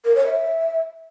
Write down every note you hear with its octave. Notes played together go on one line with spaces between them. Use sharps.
A#4
C#5
E5